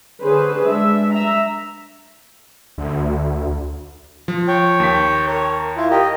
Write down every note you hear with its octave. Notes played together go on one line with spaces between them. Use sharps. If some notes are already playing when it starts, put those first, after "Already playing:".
D3 C#4 G#4 B4 C5
G#3 D4 E5
E5 A#5
D2
F3
C#5 G5
D#2 B6
A#4 C#5
E4 F4
G4 A#4 D#5